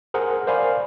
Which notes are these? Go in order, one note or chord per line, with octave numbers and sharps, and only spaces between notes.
G#4 A#4 C5 F#5
A#4 C5 D5 F5 G#5 B5